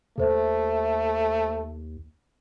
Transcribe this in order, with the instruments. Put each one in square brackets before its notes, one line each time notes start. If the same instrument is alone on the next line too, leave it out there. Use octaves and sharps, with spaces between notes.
[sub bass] D#2 [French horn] A3 [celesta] A4 C5 E5